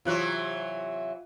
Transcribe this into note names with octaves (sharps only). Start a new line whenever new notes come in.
C3 E3 F#3 F4 F#6